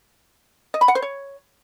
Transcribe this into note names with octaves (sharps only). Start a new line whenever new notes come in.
D#5
B5
F#5
C5
C#5